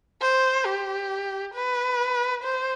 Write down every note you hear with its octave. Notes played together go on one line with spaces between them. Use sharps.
C5
G4
B4
C5